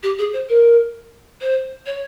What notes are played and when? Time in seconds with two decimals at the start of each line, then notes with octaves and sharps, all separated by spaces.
0.03 G4
0.18 G#4
0.33 C5
0.49 A#4
1.41 C5
1.86 C#5